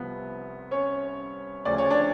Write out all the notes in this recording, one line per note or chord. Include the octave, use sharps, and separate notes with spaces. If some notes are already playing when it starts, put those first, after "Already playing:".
Already playing: C2 C3 F3 B3
C#4 C#5
D2 C#3 F3 D5
C#5
D4 D5